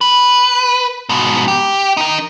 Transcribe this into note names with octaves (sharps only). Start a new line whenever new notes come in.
B4
G#2 B2
G4
D#4 A#4